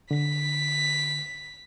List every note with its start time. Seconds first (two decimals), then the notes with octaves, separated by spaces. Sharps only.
0.11 D3 B6